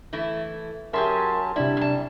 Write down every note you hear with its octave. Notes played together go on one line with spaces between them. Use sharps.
E3 A3 E4
F#3 C#4 G4 G#4 A#4 E5 A5 C6
C3 G3 D4 E4 D5
F#2 A5